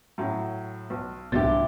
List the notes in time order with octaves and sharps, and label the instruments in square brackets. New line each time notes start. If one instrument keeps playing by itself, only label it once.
[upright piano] A2 F#3
B1
[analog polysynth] C2 D4 [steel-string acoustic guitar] G#2 E4 G4 [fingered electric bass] B2 F#3 [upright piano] A6